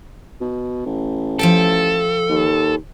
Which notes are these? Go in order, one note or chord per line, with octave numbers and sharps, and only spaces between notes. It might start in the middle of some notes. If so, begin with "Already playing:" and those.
B2
A1
F3 A4 E5 G5
D#2